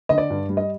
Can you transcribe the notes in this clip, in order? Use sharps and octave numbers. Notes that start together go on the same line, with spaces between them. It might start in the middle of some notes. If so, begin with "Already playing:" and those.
D3 D#5
D5
G2
G3
D#5